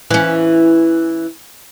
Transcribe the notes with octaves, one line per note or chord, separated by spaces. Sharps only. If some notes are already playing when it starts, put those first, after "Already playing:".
E3 C#4